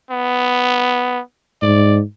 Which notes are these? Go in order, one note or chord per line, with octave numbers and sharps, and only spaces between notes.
B3
G#2 D5